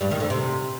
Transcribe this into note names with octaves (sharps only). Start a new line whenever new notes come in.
G2 G3
D#2 D#3
D2 D3
C3